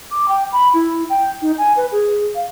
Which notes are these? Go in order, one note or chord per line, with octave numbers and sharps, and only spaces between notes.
D6
G5
B5
E4
G5
D#4
G#5
B4
G#4
F5